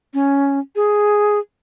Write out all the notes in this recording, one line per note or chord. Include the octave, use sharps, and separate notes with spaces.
C#4
G#4